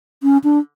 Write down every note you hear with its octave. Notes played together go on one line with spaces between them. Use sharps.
C#4
D4